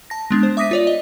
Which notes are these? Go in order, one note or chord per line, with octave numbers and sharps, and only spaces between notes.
A5 A#6
G#3 B3 D4
C5
E5 D6 D#6 A#6 B6 D#7
F4 C#5 D5
D#5